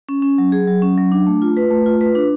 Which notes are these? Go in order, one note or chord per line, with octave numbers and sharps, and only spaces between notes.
C#4
C#4
F#3
G#4
F#3
C#4
F#3
D4
A3
F4
B4
A3
F4
B4
D4